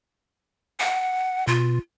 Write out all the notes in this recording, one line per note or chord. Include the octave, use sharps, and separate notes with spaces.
F#5
B2 F4